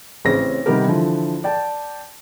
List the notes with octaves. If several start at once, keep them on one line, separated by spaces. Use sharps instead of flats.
A1 C#3 C4 C#4 A#6
C3 D#3 G3 B3 G4 A#4
D3 E3 F3
D5 G5 A5